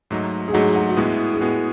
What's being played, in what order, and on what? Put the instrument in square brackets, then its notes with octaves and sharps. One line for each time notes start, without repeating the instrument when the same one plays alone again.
[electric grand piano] G#2 F#3 A3 D#4
[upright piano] G#4
[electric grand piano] G#2 F#3 A3 D#4 [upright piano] F#4
[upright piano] F#4
F#4
[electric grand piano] A2 G#3 B3 [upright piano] E4
[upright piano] G#4
[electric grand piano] A2 G#3 B3 [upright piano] F#4